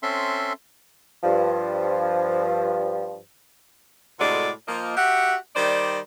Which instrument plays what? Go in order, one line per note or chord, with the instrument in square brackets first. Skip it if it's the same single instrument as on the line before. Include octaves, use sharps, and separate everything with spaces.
[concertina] C4 C#4 A4 E5 C6
[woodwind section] G2 F3
[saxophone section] A2 C3 G#3 F#4 A4 D5
F3 A#3 D#5
F#4 G4 E5 F#5
D#3 G3 C5 D5